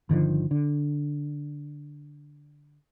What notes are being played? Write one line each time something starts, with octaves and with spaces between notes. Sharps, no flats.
G1 D3 D#3 F3
D3